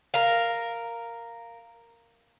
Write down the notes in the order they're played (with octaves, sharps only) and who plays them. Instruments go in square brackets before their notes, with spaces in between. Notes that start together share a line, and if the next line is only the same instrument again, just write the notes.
[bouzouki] A#4 F5